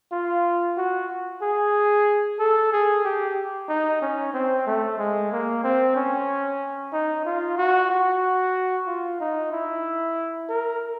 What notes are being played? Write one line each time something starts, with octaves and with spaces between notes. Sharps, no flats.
F4
F#4
G#4
A4
G#4
G4
D#4
C#4
C4
A3
G#3
A#3
C4
C#4
D#4
F4
F#4
F#4
F4
D#4
E4
A#4